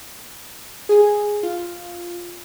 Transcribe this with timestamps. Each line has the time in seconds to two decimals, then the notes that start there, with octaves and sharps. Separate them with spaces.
0.89 G#4 G#5
1.43 F4